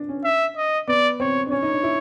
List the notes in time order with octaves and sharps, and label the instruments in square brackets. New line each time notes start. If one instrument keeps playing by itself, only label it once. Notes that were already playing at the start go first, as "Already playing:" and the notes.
Already playing: [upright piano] D4
C#4
[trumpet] E5
D#5
[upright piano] B3 [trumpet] D5
[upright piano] C4 [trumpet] C#5
[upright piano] D4
[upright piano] C#4 [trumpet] C#5
[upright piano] D#4
D4
E4